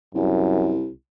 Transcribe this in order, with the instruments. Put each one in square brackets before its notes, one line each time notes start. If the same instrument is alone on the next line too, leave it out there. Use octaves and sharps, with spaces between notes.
[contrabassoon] C2 [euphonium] F#2